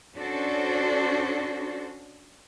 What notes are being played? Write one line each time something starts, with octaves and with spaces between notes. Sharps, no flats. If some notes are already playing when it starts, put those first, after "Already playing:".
C#4 D4 F#4 A4 C5